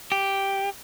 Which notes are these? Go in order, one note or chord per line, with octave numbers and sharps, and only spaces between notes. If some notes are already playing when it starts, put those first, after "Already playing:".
G4